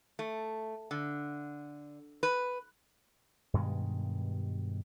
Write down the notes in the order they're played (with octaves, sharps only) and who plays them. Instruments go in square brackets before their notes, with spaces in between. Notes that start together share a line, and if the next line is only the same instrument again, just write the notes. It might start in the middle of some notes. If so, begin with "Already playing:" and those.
[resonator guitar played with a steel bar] A3
D3
B4
[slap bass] G2 B2 D#3 G#3